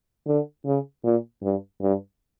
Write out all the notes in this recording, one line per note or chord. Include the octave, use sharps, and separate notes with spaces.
D3
C#3
A#2
G2
G2